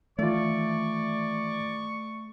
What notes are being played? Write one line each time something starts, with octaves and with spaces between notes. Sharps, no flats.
D#3 E3 A3 F4 D5 C#6